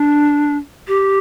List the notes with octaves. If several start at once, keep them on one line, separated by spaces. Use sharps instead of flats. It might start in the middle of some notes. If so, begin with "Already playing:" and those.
Already playing: D4
G4